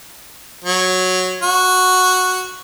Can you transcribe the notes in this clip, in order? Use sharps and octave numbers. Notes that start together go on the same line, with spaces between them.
F#3
F#4